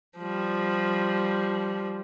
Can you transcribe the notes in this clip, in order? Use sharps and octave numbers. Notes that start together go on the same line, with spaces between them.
F3 G3